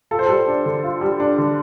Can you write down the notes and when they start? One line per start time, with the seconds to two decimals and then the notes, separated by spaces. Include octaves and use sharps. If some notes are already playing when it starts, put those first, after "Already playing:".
0.11 F4 A4
0.19 C5
0.26 G3 A4
0.48 D4
0.66 D3
0.84 F4
1.01 G3
1.20 D4
1.38 D3